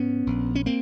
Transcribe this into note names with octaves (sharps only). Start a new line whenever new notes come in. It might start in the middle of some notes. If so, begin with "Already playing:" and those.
Already playing: G#2 B3 C#4
A#1
C#4
A#3 C4